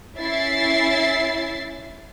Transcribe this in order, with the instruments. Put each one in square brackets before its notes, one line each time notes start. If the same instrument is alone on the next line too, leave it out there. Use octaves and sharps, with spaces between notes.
[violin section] C#4 E4 E5 A6 C7